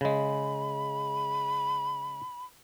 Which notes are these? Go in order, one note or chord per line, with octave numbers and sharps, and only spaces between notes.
C#3 G#3 B5